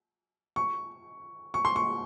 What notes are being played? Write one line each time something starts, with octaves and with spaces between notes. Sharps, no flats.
C#6
C#6
C6
C#6